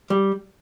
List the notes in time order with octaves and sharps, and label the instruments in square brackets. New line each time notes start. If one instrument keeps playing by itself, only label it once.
[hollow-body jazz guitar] G3